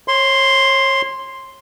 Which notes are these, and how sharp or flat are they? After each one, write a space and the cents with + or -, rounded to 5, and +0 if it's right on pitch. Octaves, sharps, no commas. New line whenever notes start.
C#5 -30 C6 +0